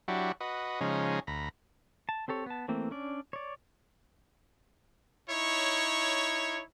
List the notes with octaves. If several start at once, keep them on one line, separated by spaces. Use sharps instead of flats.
F#3 D4 E4 F#4 G4
F#4 B4 D#5
C#3 F3 G#3 C#4 D#4
D2 A#5 B5
A5
C4 G4 A4 C#5
B3 A5
E3 A3 A#3 C4
C#4 D4 D5
C#5 D5
D#4 E4 C#5